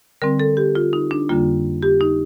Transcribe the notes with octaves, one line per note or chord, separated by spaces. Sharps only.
D3 G3 C4 A#4
A4
G4
F4
D#4
D4
F2 D3 G3 A#3 F4
G4
D#4